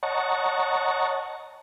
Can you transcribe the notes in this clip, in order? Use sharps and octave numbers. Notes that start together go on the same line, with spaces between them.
C#5 D#5 F#5 A5 A#5 C#6